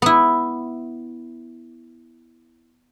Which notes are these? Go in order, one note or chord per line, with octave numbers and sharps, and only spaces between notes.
B3 E4